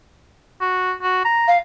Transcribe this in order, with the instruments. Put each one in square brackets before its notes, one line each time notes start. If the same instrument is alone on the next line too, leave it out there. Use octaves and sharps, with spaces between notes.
[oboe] F#4
F#4
A#5
[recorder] F5